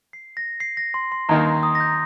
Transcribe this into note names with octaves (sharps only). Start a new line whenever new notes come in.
C7
A#6
C7
A#6
C6
C6
D#2 D#3 A#3 A#5
C6
D#6
A#6
G6